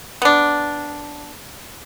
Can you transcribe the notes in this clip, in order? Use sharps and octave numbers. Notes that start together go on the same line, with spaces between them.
B3 D4